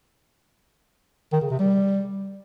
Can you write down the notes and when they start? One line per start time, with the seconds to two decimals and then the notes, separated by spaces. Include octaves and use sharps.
1.33 D#3
1.42 C#3
1.50 C3
1.59 G3